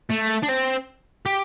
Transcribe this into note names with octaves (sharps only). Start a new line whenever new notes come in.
A3
D4
C4
G4